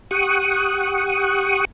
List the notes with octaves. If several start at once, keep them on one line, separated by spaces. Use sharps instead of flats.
G4 F#5 C#6 D#6